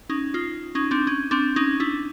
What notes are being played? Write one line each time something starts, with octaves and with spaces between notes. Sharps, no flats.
C#4 D#4
D#4 F4
C#4 D#4
C4 D4
C#4
C4 D4
C#4 D#4
D4 E4